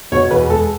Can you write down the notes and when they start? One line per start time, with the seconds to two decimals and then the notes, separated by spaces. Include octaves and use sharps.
0.12 B2 C#5
0.30 E2 B4
0.49 G#3 A4